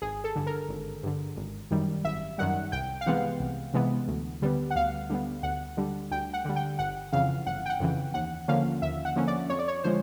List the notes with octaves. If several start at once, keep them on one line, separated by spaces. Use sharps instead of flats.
G#1 G#4
A4
G2 D3
A#4
G#1
G2 D3
G#1
F#2 D#3 G3
G#1 E5
F#2 D#3 G3 F#5
C2 G5
F5
C3 E3 G#3 B3 F#5
C2
C3 E3 G#3 B3
D2
D3 G3 B3
F#5
D2 F5
D3 G3 B3
D2 F#5
D3 G3
D2 G5
F#5
D3 G3
G5
G1 F#5
F2 C#3 E3 F5
G1 F#5
G5
F#5
F2 C#3 E3
D#2 F#5
D3 F3 A#3 C#4 F5
D#2 E5
F#5
D3 F3 A#3 C#4
D5
F2 C#5
D5
C#5
D3 F3 G#3 C5